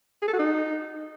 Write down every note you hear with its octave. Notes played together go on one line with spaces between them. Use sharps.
G#4
A4
F#4
D#4